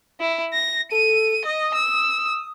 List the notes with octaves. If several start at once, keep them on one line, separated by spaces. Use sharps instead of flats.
E4
A#6
A4 D#7
D#5 D#6
E6